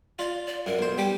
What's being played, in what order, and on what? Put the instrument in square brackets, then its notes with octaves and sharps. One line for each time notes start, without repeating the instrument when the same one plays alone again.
[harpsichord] F4 [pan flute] D5
[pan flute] D5
[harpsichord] F#2 [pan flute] A#4
[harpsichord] B1 C5
[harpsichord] G3 G4 [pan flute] G5